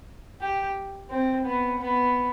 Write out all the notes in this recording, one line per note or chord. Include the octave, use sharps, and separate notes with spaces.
G4
C4
B3
B3